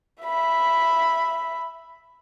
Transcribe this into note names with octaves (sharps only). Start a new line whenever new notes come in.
E5 B5